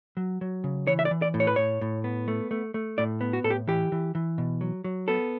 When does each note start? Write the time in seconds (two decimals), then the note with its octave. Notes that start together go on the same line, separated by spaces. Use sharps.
0.17 F#3
0.41 F#3
0.64 C#3
0.87 E3 C#5
0.99 E5
1.05 D5
1.11 E3
1.22 D5
1.34 A2
1.40 C#5
1.47 B4
1.56 A2 C#5
1.81 A2
2.04 B3
2.28 A3
2.51 A3
2.74 A3
2.98 A2 D5
3.21 B3
3.33 F#4
3.44 A2 A4
3.50 G4
3.68 E3 G4
3.92 E3
4.15 E3
4.38 B2
4.61 F#3
4.84 F#3
5.08 B3 A4